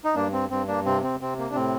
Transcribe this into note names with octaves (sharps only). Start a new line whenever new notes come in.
D#4
G2 A#3 D4
C4
G2 C4
A#3 D4
C3 C4
C4
C3 C4
A#3
D4
A2 C4